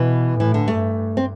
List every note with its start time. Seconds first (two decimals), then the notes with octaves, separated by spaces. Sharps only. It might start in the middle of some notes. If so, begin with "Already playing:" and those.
Already playing: B2 E3
0.39 A2 E3
0.54 D3
0.68 G2 A3
1.17 C4